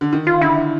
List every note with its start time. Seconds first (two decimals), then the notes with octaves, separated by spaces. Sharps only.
0.01 D3
0.13 D#3
0.27 F4
0.42 D3 E4